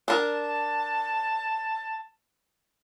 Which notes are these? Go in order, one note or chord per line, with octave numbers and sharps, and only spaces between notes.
D4 A#4 A5